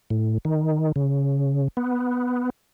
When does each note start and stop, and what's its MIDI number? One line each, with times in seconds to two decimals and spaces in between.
0.10 0.38 45
0.45 0.92 51
0.96 1.68 49
1.77 2.50 59